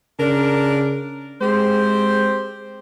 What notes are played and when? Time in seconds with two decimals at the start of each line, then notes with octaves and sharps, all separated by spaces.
0.20 C#3 D4 A#4
1.41 G#3 C4 G4 C5